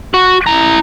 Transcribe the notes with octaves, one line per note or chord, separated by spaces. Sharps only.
F#4
E4 A#5